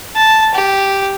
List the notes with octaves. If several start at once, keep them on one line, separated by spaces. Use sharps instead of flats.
A5
G4